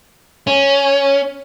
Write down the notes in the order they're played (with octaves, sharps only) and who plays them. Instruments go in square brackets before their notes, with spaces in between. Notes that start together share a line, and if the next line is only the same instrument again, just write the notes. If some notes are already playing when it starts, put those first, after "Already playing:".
[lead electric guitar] C#4